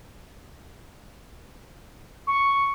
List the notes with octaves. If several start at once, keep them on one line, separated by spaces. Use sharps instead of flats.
C#6